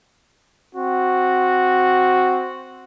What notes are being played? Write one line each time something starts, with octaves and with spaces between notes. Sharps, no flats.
C4 F#4